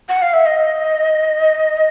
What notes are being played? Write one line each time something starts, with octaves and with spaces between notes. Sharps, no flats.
F#5
F5
E5
D#5